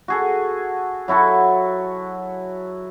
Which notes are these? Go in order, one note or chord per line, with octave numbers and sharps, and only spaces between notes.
F#4 G#4 A4
F#3 E4 F#4 A4